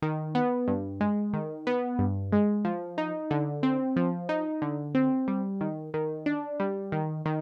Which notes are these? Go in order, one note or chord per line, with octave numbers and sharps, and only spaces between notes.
D#3
B3
G2
G#3
D#3
B3
G2
G#3
F3
D#4
D3
C4
F3
D#4
D3
C4
G3
D#3
D#3
D4
G3
D#3
D#3